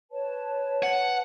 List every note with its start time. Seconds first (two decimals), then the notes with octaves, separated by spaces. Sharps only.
0.11 B4 C#5 A5
0.83 F#5